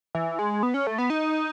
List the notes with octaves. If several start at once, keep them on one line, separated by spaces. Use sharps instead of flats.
E3
G#3
B3
C#4
A3
B3
D#4